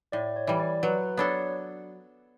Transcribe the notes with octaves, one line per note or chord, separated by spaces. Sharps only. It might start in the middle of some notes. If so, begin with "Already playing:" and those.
A2 D5
C#5
E3 G3
D5
F#3 B4
B3 D4 A4 C#5